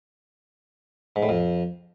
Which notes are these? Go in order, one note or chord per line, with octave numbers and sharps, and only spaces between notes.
G#2
A2
F2